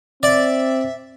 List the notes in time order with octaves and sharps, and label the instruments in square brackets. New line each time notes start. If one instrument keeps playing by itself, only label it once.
[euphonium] C4 [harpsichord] D5 [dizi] E5